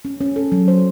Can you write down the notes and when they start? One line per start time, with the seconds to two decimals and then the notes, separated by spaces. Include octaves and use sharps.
0.05 C#4
0.21 C#4
0.36 A4
0.52 F#3
0.68 C5